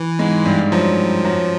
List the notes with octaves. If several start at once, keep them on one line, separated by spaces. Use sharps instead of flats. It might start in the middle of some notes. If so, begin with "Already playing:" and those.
Already playing: E3
G#2 G#3
G2 G3
F#2 F3 F#3
F#2 F#3